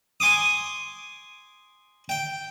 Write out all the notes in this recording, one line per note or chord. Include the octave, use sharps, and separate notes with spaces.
G#5 C6 D6 D#6
G5